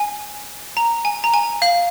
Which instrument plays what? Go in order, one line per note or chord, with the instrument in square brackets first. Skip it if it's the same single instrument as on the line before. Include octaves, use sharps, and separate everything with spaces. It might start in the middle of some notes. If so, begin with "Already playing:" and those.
Already playing: [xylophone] G#5
A#5
G#5
A#5
G#5
F5